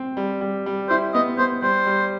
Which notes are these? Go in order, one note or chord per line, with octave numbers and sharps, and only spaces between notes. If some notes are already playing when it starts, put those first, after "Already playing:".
Already playing: C4
G3
G3
G3
E4 C5
B3 D#5
B3 C5
G3 C5
G3